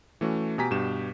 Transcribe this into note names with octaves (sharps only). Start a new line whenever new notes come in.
E3 A3 C#4 F#4
B2 G4 G#5 A#5 B6
G2 B2 G4 E7